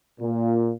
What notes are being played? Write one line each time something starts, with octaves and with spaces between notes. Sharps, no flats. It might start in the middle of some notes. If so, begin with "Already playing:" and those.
A#2